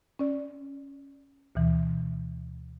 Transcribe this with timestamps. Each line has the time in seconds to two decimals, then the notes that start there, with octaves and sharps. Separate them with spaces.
0.19 C#4 D5
1.55 D2 B2 E3